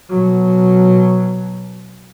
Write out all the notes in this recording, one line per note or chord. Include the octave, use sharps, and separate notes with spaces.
B2 F#3